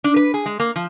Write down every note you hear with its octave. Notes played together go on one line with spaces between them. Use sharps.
D4
B4
G#4
G#3
A#3
F3